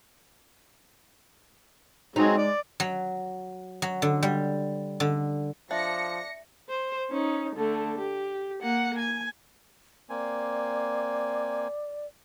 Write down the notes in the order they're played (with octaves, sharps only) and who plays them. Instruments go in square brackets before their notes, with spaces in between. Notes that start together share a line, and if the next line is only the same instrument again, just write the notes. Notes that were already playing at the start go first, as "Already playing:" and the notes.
[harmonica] F#3 C4 G#4 [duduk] G#3 [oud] D#4
[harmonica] D5 D6
[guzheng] F#3
F#3
D3
G3
D3
[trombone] F3 [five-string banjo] D4 [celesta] E5 [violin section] A#6 C#7
[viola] C5
C#4 D#4
D3 A3
G4
A#3 F#5
G#5
[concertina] A#3 C4 G#5 [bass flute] D5